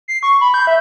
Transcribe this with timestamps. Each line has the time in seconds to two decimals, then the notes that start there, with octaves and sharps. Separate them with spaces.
0.08 C7
0.23 C#6
0.41 B5
0.54 G6
0.67 E5